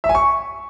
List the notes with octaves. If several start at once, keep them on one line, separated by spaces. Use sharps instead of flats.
E5
G#5
C#6